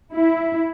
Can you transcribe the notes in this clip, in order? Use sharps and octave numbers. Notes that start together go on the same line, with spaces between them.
E4